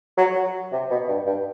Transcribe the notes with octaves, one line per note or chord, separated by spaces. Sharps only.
F#3
F#3
C3
B2
G2
G2